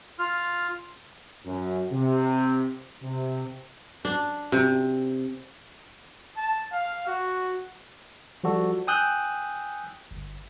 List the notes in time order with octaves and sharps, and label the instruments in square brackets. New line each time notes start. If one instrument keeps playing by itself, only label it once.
[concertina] F4 F6
[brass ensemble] F#2
C3
C3
[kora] D4
C3
[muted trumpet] A5
F5
F#4
[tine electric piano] F3 G3 F#4 A4 D5
G5 G#5 D#6 E6 F#6 G6
G1